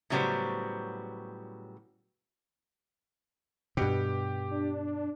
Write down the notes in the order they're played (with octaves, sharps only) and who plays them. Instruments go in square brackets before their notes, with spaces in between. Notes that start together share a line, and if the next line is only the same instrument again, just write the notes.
[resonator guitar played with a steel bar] A2 C#3 F#3 G3 B3 C5
[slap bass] G2 B2 [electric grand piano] G4
[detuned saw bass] D4